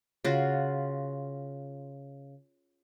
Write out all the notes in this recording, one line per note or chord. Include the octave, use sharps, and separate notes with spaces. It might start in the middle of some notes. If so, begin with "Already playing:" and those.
C#3 F4 F#4